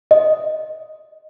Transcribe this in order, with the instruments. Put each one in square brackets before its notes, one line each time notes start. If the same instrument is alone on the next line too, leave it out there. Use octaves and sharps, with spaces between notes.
[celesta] D#5